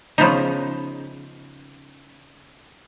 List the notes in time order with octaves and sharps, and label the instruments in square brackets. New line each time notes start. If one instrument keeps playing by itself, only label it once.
[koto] C#3 F3 B3 D#4